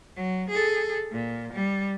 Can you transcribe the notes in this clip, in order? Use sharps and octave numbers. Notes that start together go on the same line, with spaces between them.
F#3
G#4 A4
A#2
G3